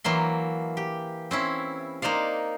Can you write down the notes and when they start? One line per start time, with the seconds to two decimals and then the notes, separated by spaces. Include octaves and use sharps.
0.04 E3 F#3 A#3 C6
0.77 G4
1.31 C4 C#4 E4
2.02 A#3 D#4 C5 D5 F5